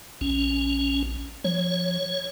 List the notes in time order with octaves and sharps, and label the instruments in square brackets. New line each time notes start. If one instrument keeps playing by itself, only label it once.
[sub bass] A#1 [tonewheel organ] C#4
[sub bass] F3 [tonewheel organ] C#5